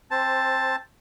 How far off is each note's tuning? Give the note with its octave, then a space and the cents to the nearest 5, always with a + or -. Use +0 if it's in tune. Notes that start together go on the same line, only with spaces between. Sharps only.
C4 +20 C5 +0 A5 +5